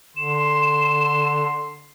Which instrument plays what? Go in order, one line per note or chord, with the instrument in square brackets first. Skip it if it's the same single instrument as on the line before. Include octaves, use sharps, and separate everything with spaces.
[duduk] D3 [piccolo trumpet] C6 [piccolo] E7